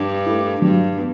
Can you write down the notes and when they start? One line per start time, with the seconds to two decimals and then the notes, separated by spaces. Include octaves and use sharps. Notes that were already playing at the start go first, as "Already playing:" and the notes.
Already playing: G2
0.26 A3 E4
0.62 G2 F#3
0.98 B3